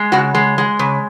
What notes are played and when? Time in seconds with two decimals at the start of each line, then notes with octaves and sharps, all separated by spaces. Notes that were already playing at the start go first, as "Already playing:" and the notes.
Already playing: G#3
0.12 C#3 F#4
0.35 G#3
0.58 G#3
0.79 C#3